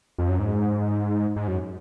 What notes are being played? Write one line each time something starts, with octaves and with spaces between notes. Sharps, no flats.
F2
F#2
G#2
G#2
F#2